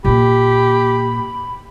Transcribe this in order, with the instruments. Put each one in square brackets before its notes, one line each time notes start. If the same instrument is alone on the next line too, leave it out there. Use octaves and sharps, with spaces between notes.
[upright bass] A#2 A#3 [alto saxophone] G4 [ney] B5